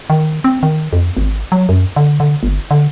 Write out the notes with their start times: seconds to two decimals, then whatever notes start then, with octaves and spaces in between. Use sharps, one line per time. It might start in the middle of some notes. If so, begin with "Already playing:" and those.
0.10 D#3
0.44 C4
0.63 D#3
0.93 F2
1.17 G#1
1.52 F#3
1.69 F#2
1.96 D3
2.20 D3
2.43 G1
2.71 D3